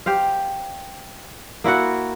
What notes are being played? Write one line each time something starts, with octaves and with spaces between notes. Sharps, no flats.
G4 C5 F5
A#3 E4 F#4 F#5